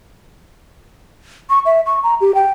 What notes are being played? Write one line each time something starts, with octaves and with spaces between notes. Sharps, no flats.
C#6
E5
C#6
A#5
G4
G5